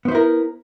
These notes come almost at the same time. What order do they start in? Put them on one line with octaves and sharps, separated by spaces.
B3 C5 E4 A#4